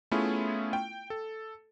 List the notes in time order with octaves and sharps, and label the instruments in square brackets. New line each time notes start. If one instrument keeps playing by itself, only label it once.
[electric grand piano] A3 B3 C#4 E4 F4 G#4
G5
A4